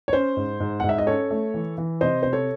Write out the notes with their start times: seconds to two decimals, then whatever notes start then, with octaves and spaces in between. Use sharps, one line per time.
0.08 C#5
0.13 C#4 C5
0.37 G#2
0.60 G#2
0.80 F#5
0.84 G#2
0.89 E5
0.98 D#5
1.07 C#4 A4 C#5
1.31 A3
1.54 E3
1.78 E3
2.01 C3 C5 D#5
2.23 C3 C5
2.33 A4 C#5